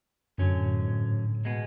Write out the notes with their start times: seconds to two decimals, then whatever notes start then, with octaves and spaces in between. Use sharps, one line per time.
0.38 F#2 D3 F#3 C#4
0.52 A2
0.65 A2
0.78 G#2
0.91 A2
1.45 B2 G#3 B3